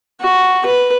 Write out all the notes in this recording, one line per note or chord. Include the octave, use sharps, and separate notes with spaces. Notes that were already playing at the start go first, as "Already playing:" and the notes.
F#4
B4